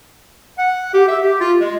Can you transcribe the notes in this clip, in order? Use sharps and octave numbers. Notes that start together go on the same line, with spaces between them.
F#5
G4
E5
G4
F4
G#3